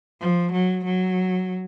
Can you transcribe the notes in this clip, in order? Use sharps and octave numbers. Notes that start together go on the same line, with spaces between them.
F3
F#3
F#3